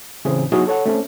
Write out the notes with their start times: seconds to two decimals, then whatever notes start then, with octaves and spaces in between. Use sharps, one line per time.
0.25 A2 C#3 E3 C4 G#4
0.52 F#3 B3 D#4 E4 F#4 G#4
0.67 A4 C#5 F#5
0.86 A3 C4 C#4